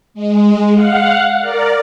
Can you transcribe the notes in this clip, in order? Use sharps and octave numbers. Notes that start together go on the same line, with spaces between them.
G#3
F5 F#5
A#4 D5